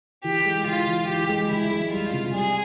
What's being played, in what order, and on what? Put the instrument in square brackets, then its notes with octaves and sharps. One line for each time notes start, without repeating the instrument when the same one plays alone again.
[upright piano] E3 [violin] G4
[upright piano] G#3
[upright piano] E3 [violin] F4
[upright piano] E3
[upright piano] E3 [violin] G4
[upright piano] G#3
[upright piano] E3 [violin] E4
[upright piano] G#3
[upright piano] G3 [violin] F4
[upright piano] C3
[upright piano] G3 [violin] G#4